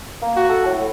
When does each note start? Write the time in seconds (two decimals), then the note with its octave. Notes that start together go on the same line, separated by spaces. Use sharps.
0.22 A#3
0.37 F#4
0.49 A4
0.66 A2